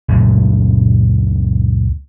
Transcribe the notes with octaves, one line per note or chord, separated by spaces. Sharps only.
C#2 F#2 A#2 A3